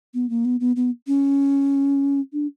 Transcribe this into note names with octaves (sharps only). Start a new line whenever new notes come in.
B3
A#3
B3
B3
B3
C#4
D4